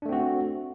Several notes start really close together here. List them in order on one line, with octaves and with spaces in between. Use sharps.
D4 A3 C4 F#4